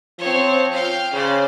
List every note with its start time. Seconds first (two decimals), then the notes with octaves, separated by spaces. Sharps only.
0.19 F3 C4 C#5
0.72 F5 G5
1.13 C#3 C5 D5